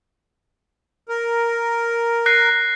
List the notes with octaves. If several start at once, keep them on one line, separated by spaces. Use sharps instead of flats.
A#4
F#6 A#6 C7